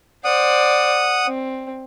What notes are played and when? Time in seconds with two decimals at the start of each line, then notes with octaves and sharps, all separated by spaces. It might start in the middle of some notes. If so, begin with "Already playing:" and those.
0.25 C5 D5 F#5 D#6
1.25 C4